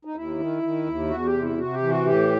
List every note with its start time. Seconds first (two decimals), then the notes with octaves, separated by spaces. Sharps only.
0.05 D#4
0.15 D#2 E4
0.39 D#3
0.63 D#3
0.86 D#2
1.10 E2 F#4
1.26 G4
1.34 C3
1.42 E4
1.58 C3 F#4
1.73 G4
1.82 E3
1.89 F#4
2.06 A2 G4